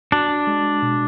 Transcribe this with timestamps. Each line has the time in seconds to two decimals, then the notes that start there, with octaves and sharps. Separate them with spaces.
0.12 D4 F#4
0.47 G#3
0.82 B2